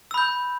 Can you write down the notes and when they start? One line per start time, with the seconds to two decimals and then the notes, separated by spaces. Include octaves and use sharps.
0.11 E6
0.14 B5
0.18 G6